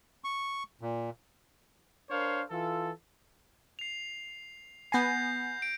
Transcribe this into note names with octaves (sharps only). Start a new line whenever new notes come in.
C#6
A#2
D4 A#4 C5 C#5 F5
E3 F4 A4
C7 F7
B3 G#5 G6 A#6 C7
D7